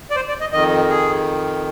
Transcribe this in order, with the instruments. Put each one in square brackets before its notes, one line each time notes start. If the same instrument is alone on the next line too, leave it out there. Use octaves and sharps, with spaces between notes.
[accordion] D5
C5
D5
D#5
F2 D#3 D#5
G#4